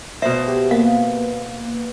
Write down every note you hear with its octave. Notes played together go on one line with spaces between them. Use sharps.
B2 C5 E5
G4
A#3 B3 B4 F5